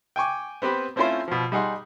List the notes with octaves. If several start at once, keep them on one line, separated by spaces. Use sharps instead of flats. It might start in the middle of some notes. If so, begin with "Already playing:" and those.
G5 G#5 C#6 D6
B3 C4 G4 B4
A3 C4 C#4 E4 F4 C5
B2 F3
G3 D#4 G#4 F#5 C6